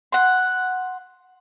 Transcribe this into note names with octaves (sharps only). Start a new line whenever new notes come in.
F#5 C6